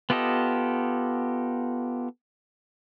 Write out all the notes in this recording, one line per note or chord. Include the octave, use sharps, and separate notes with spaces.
B3 F4 G4 A4 D#5